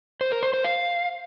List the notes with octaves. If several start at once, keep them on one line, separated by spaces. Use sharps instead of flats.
C5
A#4
C5
C5
F5